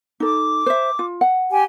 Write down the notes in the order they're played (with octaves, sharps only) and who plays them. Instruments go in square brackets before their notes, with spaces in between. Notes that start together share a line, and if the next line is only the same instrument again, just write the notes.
[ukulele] D#4 A4 [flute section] D6
[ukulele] C5 E5
F4
F#5
[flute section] G4 G5 G#5